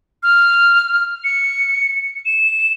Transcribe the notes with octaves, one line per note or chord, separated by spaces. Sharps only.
F6
C#7
E7